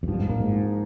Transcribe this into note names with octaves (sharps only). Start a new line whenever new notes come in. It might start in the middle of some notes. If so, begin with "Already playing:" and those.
F2
G2 F3
A#2
G#2
A#2 A#3
G#2
F3